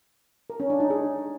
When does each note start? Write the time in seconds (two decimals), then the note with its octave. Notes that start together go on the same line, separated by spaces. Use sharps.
0.50 A#4
0.60 C#4
0.70 D4
0.80 D#4
0.90 G#4